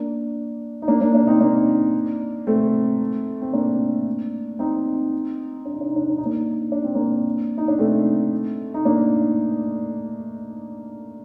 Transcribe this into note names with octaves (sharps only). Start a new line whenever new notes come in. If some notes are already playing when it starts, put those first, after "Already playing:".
Already playing: A#3 D4
D#4
A#3 D4
A#3 D4
A#3 D4
C4 D#4
A#3 D4
A3 C4
C4
A#3 D4
C4 D#4
D4
D#4
D4
D#4
D4
D#4
D4
D#4
A#3 D4
D4
C4
A#3 D4
D#4
D4
A3 C4
D#4
A#3 D4